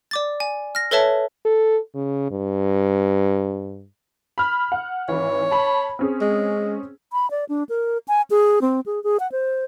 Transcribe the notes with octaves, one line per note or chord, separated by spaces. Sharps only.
D5 D6 A6
G#5
F6 A#6
A4 B4 C#5 E5 A5
A4
C#3
G2
B5 F6
F#5
G#1 E3 C#5
A5 B5
C4 C#4 G#4
G#3
B5
D5
D4
A#4
G#5
G#4
C4
G#4
G#4
F#5
C5